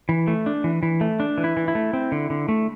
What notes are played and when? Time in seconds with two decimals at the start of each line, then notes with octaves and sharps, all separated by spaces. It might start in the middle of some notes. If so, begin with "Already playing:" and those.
0.09 E3
0.27 A3
0.46 D4
0.64 E3
0.83 E3
1.01 A3
1.20 D4
1.38 E3
1.44 E4
1.57 E3
1.68 E4
1.75 A3
1.93 C4
2.12 D3
2.30 D3
2.49 A3